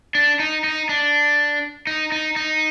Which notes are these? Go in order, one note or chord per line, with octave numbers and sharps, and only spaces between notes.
D4
D#4
D#4
D4
D#4
D#4
D#4